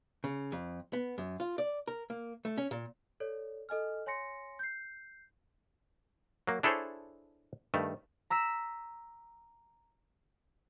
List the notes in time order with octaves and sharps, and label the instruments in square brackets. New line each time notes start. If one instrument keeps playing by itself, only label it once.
[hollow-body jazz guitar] C#3
F2
B3
F#2
F4
D5
A#4
A#3
A3
C#4
A#2
[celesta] A4 C#5 D5
A4 D#5 G#5 F6
C#5 G#5 C6 A#6 C#7
G6 C7
[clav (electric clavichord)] F#3 A#3
D4 E4 G#4 A4 C5 C#5
G2 D#3 A3
[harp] A#5 E6 B6 E7